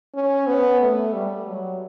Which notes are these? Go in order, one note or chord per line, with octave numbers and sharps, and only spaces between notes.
C#4
B3
A3
G3
F#3